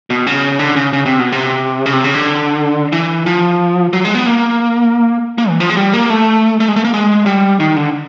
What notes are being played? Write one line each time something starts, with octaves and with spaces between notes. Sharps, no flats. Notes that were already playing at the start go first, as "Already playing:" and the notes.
B2
C#3
D3
C#3
C#3
C3
B2
C3
C#3
C3
C#3
D3
E3
F3
F#3
G#3
B3
A#3
A#3
E3
F3
G#3
G3
A#3
A3
A3
G#3
A3
A#3
G#3
G3
D#3
D3